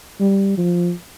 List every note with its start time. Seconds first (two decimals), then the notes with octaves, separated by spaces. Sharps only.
0.20 G3
0.57 F3